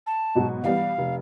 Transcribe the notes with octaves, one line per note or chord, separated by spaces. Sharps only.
A5
G#2 B2 F#3
E3 G3 B3 F5
F1